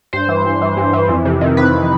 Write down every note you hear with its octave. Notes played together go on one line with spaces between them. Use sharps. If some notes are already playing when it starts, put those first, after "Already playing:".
G2 C5
E3
G2
E3
G2
E3
F2
C3
D#3
F2 B4